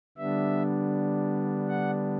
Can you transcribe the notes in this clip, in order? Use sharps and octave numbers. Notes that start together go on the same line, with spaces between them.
D3 G3 B3 D4 E5
F#5